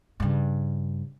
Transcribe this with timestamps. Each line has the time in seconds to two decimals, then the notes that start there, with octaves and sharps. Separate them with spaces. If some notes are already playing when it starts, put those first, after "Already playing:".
0.20 G2 C#3